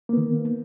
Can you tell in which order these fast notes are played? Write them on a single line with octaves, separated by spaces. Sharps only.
A#3 B3 D#3